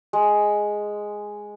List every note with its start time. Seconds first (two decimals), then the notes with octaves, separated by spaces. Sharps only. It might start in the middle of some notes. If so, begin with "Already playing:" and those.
0.13 G#3